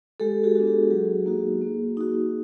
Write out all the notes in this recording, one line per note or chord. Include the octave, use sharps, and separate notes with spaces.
G#3 G4 A4
F#4 G#4
B3 D4 F#4
G4
F#3 F#4 G#4
A#3 D#4 F#4
A#3
D#4 F#4